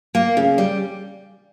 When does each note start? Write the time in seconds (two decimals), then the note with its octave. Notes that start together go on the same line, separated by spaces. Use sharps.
0.15 A#3
0.37 C#3
0.58 G3